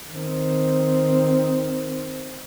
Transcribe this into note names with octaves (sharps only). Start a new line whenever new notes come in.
D#3 C4